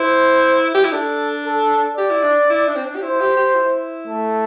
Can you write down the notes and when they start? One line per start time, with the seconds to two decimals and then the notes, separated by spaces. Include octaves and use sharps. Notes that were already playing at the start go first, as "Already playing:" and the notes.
Already playing: E4 C5
0.75 G4
0.84 E4
0.93 D4 A4
1.46 A4
1.97 G4 D5
2.10 E4
2.24 D4
2.50 E4
2.68 D4
2.76 C4
2.85 D4
2.96 G4
3.02 E4 C5
3.21 G4
3.37 G4
3.55 E4
4.07 A3